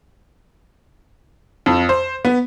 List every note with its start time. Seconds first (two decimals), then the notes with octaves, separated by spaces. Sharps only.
1.66 F2
1.89 C5
2.25 B3